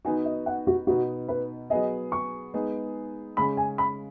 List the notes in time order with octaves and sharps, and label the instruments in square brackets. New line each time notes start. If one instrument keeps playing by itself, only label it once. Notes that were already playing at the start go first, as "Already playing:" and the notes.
[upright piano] D#3 B3 D#4 F#4 [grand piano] G#5
[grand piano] D#5
F#5
F#4
[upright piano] B2 B3 D#4 [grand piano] F#4
[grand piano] B4
[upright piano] F#3 B3 G#4 [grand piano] D#5
[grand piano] C#6
[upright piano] G#3 B3 D#4 G#4
[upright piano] C#3 G#3 C#4 [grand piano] B5
[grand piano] G#5
B5